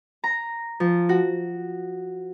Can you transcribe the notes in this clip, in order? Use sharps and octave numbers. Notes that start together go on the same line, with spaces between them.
A#5
F3
F#4